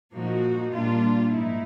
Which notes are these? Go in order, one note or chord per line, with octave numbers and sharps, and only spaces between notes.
A#2 F3 A#3 D#4 F#4
A#2 G3 A#3 D4 F4
G#2 F3 A#3 D#4 E4